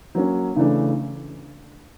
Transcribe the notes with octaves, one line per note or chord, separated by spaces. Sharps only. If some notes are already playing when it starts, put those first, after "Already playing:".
F#3 A#3 C#4
C#3 E3 A3 D4